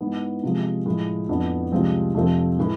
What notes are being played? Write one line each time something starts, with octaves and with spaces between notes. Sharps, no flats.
G#2 E3 B3
C3 F3 G#3
A2 F3 G#3
F2 E3 B3 D4
C2 C3 F3 G#3 C4
F2 C3 F3 A3 C4
A2 E3 G#3